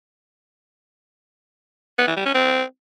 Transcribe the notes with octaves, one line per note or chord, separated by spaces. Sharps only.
B3
E3
G3
C#4
C4